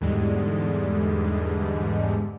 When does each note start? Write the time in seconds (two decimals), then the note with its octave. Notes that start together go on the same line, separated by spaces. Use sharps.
0.01 E2 G#2 D3 G3 G#3